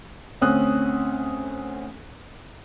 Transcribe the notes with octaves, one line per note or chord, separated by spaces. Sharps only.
D2 C4 C#4 D#6 F#6